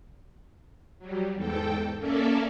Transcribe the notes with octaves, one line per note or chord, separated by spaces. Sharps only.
F#3 G3
E2 G#2 A4 G5
A#3 C#4 A4 A#4 D5 E5